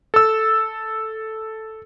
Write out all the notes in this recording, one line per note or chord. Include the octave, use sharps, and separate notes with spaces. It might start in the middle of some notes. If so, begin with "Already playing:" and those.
A4 E6